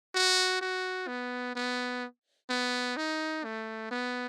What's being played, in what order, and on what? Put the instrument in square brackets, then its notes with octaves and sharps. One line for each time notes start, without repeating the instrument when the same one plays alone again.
[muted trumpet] F#4
F#4
B3
B3
B3
D#4
A3
B3